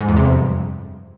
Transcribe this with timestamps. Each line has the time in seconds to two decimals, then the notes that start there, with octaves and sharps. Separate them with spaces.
0.01 G#2
0.09 E2
0.16 C3
0.24 F2
0.32 G2